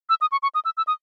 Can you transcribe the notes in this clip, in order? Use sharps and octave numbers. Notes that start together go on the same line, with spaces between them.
E6
D#6
C#6
C#6
D#6
E6
E6
D#6